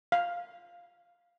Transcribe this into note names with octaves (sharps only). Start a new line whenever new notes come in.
F5